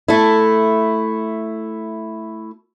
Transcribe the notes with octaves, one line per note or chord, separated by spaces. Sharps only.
A3 E4